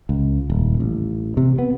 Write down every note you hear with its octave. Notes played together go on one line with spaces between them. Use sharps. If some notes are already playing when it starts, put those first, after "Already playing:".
C#2
D#1
A1
C3
B3